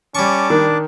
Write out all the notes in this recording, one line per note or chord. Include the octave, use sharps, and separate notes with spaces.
G3 C#4 A5 C#6 D6
D#3 D4